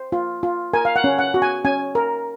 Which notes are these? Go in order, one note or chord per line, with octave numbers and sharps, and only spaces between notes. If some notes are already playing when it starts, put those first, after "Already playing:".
Already playing: C5
F4
F4
A#4 G#5
F5
F#5
C#4
F#5
F#4
G#5
C#4 G#5
A#4